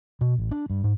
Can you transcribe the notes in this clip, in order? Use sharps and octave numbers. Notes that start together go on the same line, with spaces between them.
B2
A1
D4
G2
G#2